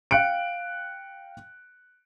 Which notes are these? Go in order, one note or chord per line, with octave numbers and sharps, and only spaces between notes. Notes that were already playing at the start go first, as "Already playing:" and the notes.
F5 G5 F#6 C#7 D7